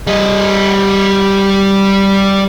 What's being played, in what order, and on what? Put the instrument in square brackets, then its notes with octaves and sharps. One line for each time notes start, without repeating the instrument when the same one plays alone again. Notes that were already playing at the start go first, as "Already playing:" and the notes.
[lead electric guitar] G3 D#5